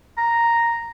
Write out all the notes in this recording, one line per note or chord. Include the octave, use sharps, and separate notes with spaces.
A#5